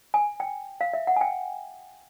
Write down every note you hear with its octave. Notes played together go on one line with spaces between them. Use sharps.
G#5
G5
F5
E5
F#5
G#5
G5